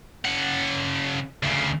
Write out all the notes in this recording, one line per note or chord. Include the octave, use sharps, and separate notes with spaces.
C#3 F#5
D2 C#3